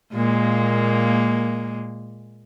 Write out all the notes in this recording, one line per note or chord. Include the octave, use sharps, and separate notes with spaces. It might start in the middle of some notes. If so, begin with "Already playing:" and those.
A#2 G#3 A#3